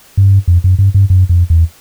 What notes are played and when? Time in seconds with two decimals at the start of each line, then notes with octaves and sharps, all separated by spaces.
0.17 G2
0.48 F2
0.64 F#2
0.79 G2
0.94 G2
1.10 F#2
1.29 F2
1.50 E2